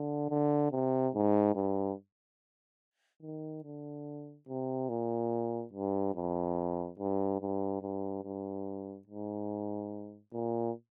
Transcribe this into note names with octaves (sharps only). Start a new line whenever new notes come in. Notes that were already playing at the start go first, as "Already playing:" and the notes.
Already playing: D3
D3
C3
G#2
G2
D#3
D3
C3
A#2
G2
F2
G2
G2
G2
G2
G#2
A#2